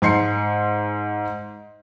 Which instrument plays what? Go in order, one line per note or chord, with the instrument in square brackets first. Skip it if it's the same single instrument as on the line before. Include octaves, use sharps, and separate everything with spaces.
[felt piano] G#2 C6 C7 C#7